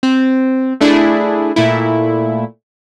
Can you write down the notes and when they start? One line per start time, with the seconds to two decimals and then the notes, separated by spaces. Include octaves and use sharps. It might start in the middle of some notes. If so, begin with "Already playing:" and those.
0.03 C4
0.81 A3 D4 E4 G#4
1.56 A#2 A3 E4